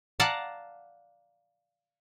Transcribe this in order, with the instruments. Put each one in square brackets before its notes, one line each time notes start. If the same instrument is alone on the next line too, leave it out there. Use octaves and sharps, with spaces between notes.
[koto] D5 F5 F#5 A5 A#5